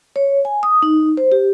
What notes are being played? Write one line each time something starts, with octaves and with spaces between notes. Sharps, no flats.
C#5
G#5
D#6
D#4
C5
G4